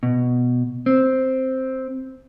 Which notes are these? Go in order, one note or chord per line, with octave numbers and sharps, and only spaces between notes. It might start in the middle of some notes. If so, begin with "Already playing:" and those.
B2
C4